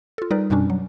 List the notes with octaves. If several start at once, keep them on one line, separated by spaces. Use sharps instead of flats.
F4 A4
G3 D#4 A#4 B4 D5
F#2 B2 G3 C#4 D4
F#3